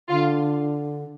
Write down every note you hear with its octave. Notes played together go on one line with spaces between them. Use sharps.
D3 F4